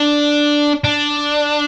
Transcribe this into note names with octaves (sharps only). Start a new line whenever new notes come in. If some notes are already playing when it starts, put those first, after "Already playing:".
Already playing: D4
D4